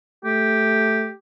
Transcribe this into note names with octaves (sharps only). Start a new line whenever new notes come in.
A3 G4